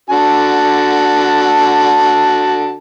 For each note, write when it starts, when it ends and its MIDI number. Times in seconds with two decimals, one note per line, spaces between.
0.10 2.77 50
0.10 2.77 66
0.10 2.77 81